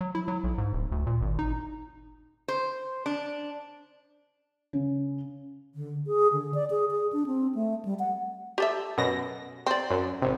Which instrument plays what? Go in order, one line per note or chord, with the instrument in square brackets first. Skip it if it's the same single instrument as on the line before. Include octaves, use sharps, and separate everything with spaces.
[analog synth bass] F#3
E4
F#3
B1
G#2
D1
D2
A#2
G#1
D#4
[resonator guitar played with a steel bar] C5
D4
[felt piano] C#3
[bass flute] D3
G#4
D3
D5
G#4
G#4
D4
C4
A3
G3
F#5
[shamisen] G4 A4 E5
[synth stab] F#2 B2 A#6
[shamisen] C4 D5
[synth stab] F#2
G#1 C3